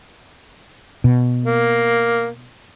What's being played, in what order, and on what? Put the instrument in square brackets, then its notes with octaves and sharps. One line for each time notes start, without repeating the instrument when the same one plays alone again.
[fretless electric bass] B2
[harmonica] A#3